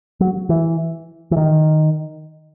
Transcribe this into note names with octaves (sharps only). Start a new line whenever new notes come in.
F#3
E3
E3
D#3